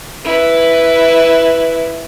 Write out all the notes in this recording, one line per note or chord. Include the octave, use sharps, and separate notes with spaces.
E4 B4